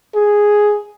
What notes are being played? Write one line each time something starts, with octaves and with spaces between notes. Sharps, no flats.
G#4